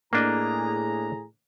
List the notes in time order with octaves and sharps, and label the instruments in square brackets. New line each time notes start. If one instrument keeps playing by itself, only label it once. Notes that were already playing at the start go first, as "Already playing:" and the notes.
[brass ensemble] A2 G#4 A#5 [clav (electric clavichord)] A#3 D4 D#5